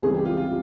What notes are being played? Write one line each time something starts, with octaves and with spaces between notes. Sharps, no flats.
C#2 C3 E3 G3 G#4
G4
F4
F4